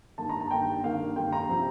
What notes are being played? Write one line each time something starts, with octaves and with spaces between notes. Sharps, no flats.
G2 D#3 A#3 A5
A#5
A5
G2 D#3 A#3 G5
G2 D#3 A#3 F5
G2 D#3 A#3 G5
A#5
C3 F3 C4